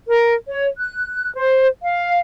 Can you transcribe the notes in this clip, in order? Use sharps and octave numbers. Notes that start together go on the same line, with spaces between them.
A#4
C#5
F#6
C5
F5